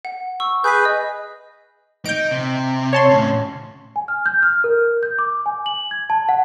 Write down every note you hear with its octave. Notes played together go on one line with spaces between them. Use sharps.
F#5
C#6 E6
G#4 B4 G6 B6
D#5
D#4 G6 D7
C3
C#5 A5 C6
A2 C#3
G#5
F6
G6
F6
A#4
G6
D6
G#5
F#7
G#6
A5
F#5